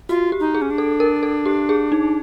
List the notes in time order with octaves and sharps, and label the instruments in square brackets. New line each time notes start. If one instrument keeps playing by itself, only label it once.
[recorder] F4 [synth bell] F#4
[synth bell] G4
[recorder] D#4
[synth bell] G#4
[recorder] C#4
D4
[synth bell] A4
A#4
A4
G4
G#4
D#4